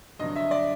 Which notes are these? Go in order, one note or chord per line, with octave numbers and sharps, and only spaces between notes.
G2 D3 F#3 D#5
E5
D5